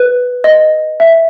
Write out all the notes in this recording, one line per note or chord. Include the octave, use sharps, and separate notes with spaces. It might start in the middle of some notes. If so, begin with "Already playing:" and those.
Already playing: B4
D#5
E5